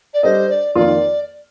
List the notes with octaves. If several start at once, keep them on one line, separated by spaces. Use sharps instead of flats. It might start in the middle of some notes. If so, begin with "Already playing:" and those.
D5
G3 D4 A4 C5 D#5
D5
F2 D#3 A#3 F4 D5